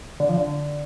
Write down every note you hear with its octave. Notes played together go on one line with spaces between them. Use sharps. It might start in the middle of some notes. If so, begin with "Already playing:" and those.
D3
F3
D3